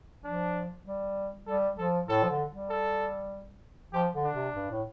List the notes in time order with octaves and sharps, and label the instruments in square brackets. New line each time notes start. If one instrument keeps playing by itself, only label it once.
[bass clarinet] F3 [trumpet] D4
[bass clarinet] G3
[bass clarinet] G3 [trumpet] A4
[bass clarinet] F3 [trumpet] A4
[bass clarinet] A2 [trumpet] A4
[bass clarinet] F3
D3
G3
[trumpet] A4
[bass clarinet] F3 [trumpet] G4
[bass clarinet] D3
[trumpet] D4
[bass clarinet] C3
G2
A2